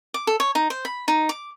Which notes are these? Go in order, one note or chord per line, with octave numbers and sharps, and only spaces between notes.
D6
A4
C#5
D#4
C5
B5
D#4
D6